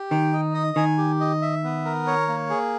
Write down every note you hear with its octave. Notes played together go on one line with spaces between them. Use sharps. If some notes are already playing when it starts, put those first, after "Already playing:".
Already playing: G4
D#3 G5
D#4
D#5
D#3 G#5
G4
D#5
E5
B3
A#4
C#5
A#3
G#4